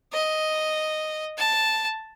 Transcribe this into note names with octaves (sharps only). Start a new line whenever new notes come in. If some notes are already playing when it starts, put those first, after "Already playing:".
D#5
A5